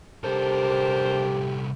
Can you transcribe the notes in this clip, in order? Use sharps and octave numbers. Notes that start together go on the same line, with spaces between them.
C2 D4 G4 A4 A#4 C5